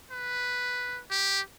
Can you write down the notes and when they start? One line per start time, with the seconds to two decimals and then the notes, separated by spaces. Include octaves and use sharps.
0.11 B4
1.10 G4